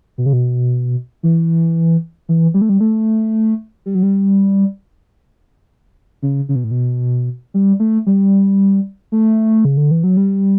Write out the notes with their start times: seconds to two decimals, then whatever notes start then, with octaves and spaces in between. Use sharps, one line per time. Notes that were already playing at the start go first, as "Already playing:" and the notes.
0.18 B2
0.26 C#3
0.33 B2
1.23 E3
2.29 E3
2.54 G3
2.61 A3
2.69 G3
2.80 A3
3.86 G3
3.95 F#3
4.03 G3
6.22 C#3
6.49 C#3
6.55 B2
6.64 A2
6.71 B2
7.54 G3
7.80 A3
8.06 G3
9.12 A3
9.65 C#3
9.77 D3
9.91 E3
10.04 F#3
10.17 G3